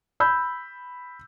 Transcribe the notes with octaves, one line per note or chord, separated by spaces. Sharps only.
B5 E6 G6